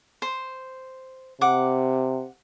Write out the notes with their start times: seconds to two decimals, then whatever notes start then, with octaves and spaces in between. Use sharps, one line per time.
0.22 C5
1.41 C3 F#5 D6